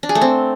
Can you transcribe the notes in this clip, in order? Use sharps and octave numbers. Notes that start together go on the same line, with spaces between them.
D4
G#4
A3
C4